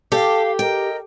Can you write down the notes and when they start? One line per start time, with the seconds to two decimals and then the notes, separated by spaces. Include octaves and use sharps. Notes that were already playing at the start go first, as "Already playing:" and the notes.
0.12 G4 A4 F5
0.59 A#4 D#5 G5